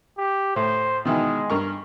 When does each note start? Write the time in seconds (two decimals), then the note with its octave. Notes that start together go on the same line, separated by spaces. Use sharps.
0.18 G4
0.56 A2 C5
1.05 B2 D#3 E3 G#3
1.50 G2 A#4 C#6